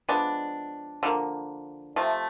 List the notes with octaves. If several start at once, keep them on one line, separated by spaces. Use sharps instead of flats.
F3 G#3 B3 D4
D3 F3 A#3
C3 F3 A3